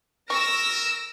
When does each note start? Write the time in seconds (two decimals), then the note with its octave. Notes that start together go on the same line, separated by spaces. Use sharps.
0.30 A#4 C#6 E6 A#6